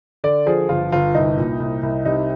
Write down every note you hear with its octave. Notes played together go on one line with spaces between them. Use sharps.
D3 D5
F3 G#4
G1 F4
G1 F4
C2 D#4
A#2
C2
C2
C3 D#4